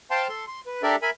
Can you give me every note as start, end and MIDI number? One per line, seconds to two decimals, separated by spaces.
0.11 0.28 72
0.11 0.28 77
0.11 0.28 79
0.11 0.28 81
0.11 0.28 84
0.29 0.45 69
0.29 0.45 84
0.47 0.60 84
0.66 0.82 71
0.83 0.96 62
0.83 0.96 67
0.83 0.96 69
0.83 0.96 70
0.83 0.96 74
0.83 0.96 76
1.02 1.10 70
1.02 1.10 76
1.02 1.10 80
1.02 1.10 83